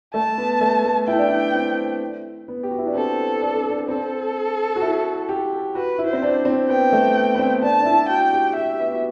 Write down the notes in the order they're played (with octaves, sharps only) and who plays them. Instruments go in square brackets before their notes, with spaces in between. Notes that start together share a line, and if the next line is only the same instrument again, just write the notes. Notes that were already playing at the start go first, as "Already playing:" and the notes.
[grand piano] A3 [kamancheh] A5
[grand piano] B3
A3
A3
[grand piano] E4 [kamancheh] G5
[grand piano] D4
E4
C4
B3
G4
F#4
E4
D4
[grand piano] C4 [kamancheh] A4
[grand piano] D4
C4
D4
[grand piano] C4 [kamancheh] A4
[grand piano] F#4
E4
G4
[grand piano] F#4 [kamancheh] B4
[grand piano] E4
[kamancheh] C5
[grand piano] C4
D4
C4
[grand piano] B3 [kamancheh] G5
[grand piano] A3
B3
B3
C4
[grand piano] D4 [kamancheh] A5
[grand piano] D4
E4
[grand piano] F#4 [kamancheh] G5
[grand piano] G4
[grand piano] G4 [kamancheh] E5
[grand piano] B3
F#4